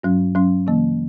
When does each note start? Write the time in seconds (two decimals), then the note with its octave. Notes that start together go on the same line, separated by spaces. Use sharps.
0.03 G2 F#3 C#4
0.35 G2 F#3 C#4
0.67 C#3 E3 A#3